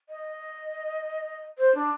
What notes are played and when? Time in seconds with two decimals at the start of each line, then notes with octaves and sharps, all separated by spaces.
0.09 D#5
1.58 C5
1.75 D4